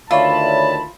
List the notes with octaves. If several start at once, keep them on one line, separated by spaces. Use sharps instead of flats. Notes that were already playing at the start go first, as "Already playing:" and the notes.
D2 D#3 F4 C#5 D5 E5 A5 B5